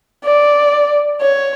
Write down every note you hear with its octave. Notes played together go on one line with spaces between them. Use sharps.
D5
C#5